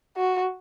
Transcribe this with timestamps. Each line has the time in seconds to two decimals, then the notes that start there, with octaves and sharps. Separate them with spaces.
0.17 F#4